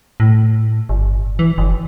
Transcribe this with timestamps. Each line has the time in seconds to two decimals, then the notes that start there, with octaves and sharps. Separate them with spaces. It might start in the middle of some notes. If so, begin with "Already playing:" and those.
0.20 A2
0.89 G1
1.39 E3
1.58 F#1